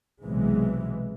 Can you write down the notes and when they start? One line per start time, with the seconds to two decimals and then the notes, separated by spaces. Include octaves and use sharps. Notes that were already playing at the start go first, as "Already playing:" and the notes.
0.24 B1 C3 E3 G#3